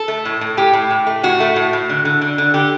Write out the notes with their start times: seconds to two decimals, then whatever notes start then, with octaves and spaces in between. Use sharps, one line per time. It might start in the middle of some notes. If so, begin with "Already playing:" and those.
Already playing: A4
0.08 A3
0.25 A2
0.41 A2
0.57 A2 G4
0.74 A2
0.91 A2
1.07 A3
1.23 A2 F#4
1.40 A3
1.56 A2
1.73 A2
1.89 D3
2.05 D3
2.21 D3
2.38 D3
2.54 D3 G4